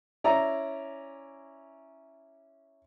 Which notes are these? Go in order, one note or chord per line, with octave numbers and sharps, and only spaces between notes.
C#4 E4 D5 A#5